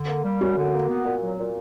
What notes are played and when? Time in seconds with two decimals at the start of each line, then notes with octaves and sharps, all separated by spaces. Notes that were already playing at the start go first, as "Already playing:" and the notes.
Already playing: D3
0.08 A#3
0.25 G3
0.41 F#2 F#4
0.57 D3
0.74 A#3
0.89 B3
1.05 A#2
1.22 F#3
1.38 A#2